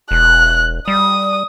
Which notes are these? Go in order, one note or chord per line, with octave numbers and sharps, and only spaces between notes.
E1 F#6
G3 D#6